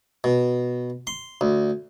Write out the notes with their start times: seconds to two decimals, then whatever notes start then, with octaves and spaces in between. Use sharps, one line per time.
0.24 B2
1.07 C6
1.41 D2